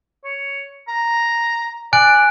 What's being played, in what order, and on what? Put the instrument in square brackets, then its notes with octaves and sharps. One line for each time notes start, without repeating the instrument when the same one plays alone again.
[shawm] C#5
A#5
[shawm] D5 [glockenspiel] G#5 F#6 D7